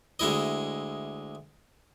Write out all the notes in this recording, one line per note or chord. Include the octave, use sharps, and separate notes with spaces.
D2 G#3 E4 D#5